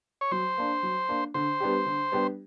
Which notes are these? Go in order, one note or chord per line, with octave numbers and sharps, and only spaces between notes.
C#5
F#3 C5
A#3 D4
F#3
A#3 D4
D3 C5
G3 B3 D4 G4
D3
G3 B3 D4 G4